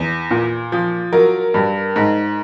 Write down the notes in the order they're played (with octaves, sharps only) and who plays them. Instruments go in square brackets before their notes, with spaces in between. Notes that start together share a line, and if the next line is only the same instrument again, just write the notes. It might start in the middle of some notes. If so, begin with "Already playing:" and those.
Already playing: [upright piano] E2
A#2
F3
F#3 A#4
G2
G#2